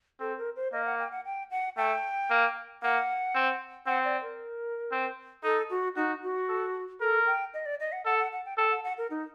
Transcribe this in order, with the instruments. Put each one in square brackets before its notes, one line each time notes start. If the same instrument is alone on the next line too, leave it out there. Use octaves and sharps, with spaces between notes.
[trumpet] C4 [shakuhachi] A4
[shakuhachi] A#4
C5
[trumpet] A#3 [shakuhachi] D#5
[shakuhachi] F#5
G5
F#5
G5
F#5
[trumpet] A3 [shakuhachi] G5
[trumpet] A#3
[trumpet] A#3 [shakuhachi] F#5
[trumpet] C4
[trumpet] C4 [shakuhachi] F#5
[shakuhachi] D5
A#4
[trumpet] C4
[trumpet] D#4 [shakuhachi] A4
[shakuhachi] F#4
[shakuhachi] D#4 [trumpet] F#4
[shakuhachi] F#4
[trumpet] A4
[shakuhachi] A4 [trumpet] A#4
[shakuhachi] G5
D#5
D5
D#5
F#5
[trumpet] A4 [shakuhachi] F#5
[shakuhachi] F#5
F#5
G5
[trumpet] A4 [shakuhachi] G5
[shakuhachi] F#5
F#5
A#4
D#4